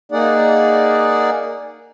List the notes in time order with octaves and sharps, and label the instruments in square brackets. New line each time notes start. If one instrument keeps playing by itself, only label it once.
[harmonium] A#3 D#4 G#4 D5 F#5